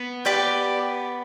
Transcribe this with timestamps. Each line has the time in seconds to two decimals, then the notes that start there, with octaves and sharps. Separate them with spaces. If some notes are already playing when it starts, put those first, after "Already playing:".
Already playing: B3
0.25 G4 B4 D5 G5